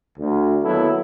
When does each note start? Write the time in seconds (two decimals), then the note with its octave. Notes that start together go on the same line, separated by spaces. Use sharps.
0.18 D2
0.64 D#2 F#3 B3 E4 A4